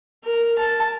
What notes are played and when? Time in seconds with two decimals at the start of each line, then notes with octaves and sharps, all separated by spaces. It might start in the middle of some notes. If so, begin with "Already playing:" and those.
0.24 A#4
0.58 A5